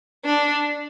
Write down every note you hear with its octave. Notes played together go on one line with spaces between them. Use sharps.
D4